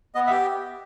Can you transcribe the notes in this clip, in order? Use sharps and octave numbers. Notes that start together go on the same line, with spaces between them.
B3 D#5
E5
G4